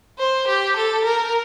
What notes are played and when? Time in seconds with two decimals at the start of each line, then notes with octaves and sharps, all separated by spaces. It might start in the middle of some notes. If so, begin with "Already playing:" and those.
0.19 C5
0.48 G4
0.76 A4
1.04 A#4